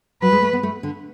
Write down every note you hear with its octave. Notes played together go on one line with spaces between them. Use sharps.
F#3 B4
G#3
A3
B3
A3
D3